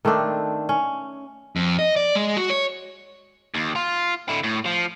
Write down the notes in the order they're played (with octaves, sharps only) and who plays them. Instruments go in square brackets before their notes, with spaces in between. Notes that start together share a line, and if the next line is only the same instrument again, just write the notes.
[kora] D#3 A3 C4 D4
C#4
[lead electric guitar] F2
D#5
D5
G#3
F#4
C#5
D#2
F4
D3 E4
A2
F3